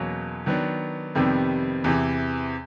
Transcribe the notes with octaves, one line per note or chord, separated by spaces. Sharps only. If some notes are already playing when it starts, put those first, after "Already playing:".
Already playing: E2 B2 F#3 A#3 C#4
D#3 F#3 B3 D4
F2 C3 D#3 G3 B3
E2 C3 E3